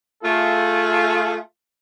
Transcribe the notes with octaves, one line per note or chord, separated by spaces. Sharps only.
A3 F4 G#4